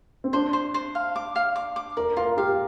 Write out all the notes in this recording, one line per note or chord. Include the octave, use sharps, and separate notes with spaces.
C4
D4 C5
C5
C5
F5
D6
F5
D6
D6
A#4 D5
F4 A#4
G4 F5